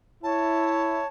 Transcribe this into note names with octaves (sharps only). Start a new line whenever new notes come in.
E4 C#5 A5